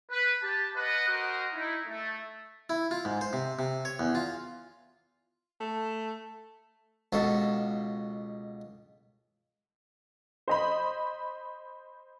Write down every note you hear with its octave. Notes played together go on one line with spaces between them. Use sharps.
B4
G4 A5
B4 D#5 F#5
F#4 A#4 C5 D#5
D#4 E4
A3
E4
F4
G#2
C5
C3
C3
C#5
E2
F4
A3
C#2 B2 A4
C5 D#5 B5